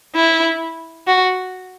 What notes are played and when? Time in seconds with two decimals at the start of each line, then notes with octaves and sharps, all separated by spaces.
0.15 E4
1.07 F#4